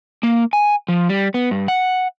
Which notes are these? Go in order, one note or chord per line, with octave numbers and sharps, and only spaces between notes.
A#3
G#5
F3
G3
B3
G2
F#5